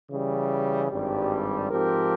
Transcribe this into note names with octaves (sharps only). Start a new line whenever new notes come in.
C#3 E3 G3
G#1 G2 G3
G#2 F3 C4 G4 A#4